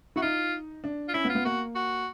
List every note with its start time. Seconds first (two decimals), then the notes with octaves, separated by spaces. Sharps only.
0.16 E4 F#4
0.22 D#4 F4
0.84 D4
1.08 F4
1.14 C#4 E4
1.25 B3
1.29 F4
1.35 B3
1.45 A#3 F#4
1.75 F#4